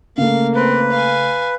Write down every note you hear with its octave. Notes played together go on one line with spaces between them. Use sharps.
C#3 A3 A#3 F5
C4 B4
F5 G#5